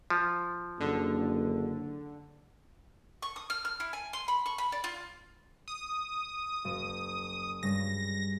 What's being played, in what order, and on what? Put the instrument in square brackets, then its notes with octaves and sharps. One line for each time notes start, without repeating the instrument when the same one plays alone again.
[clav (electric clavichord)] F3
[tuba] F#1 [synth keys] D3
[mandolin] C#6
D#6
F6
F6
E4
G#5
C6
B5
C#6
B5
D5
F4
[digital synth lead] D#6
[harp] F#1
[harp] G2 C#3 G3 [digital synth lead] A#6